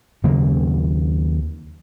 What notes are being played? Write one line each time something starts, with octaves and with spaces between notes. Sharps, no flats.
D#2 C#3 F#3 A#3